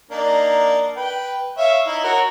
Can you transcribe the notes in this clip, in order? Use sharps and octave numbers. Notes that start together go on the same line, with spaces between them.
A#3 D4 D#4
B4 G5
C#5 E5 F5
D#4 E4
F#4 A#4 C#5